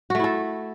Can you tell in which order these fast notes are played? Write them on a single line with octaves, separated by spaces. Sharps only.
F#4 A3 E4 A4